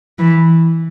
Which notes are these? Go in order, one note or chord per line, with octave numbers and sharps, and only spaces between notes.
E3